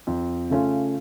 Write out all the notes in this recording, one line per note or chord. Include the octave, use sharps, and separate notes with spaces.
F2
C#3 A3 C#4 F4